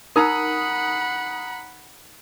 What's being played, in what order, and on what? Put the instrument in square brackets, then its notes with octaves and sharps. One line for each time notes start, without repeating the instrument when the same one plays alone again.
[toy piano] D#4 A#4 [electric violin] F#5 B5 [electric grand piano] A#5 D#6